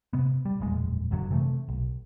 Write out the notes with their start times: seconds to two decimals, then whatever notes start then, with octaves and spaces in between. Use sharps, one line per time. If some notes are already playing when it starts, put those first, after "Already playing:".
0.13 C3 B3
0.45 G3
0.60 E1 A#1 F#2 G#3
1.11 F#1 F#2 D3 F#3
1.31 C3 E3 G#3 A3
1.69 B1